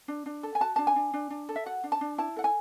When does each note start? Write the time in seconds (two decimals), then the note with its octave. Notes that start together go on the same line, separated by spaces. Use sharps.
0.08 D4
0.26 D4
0.43 A4
0.55 G#5
0.61 F#4 A5
0.76 D4 A5
0.87 G#5
0.96 D4
1.13 D4
1.30 D4
1.49 A4
1.56 E5
1.66 F#4 F#5
1.84 D4
1.92 A5
2.01 D4
2.18 E4 A5
2.36 A4 F#5
2.44 G#5